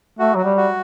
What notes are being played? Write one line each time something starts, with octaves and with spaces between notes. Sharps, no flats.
A3 F#4
F#3 F#4
G3
F#4